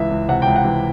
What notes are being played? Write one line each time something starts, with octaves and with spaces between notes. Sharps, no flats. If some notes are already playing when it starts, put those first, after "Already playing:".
Already playing: C#2 E3 E5
C#2
C3 F#5
G5
C#2
F#5
E3